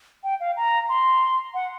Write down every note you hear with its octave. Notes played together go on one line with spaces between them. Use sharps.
G5
F5
A#5
C6
F#5